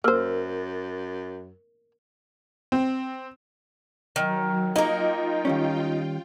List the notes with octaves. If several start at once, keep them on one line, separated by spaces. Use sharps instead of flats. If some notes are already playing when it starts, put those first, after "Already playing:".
F#2 A#3 A#4 C5 E6 F6
C4
D#3 F#3
A#3 D#4 F4 A#4 G5
D#3 G3 C#4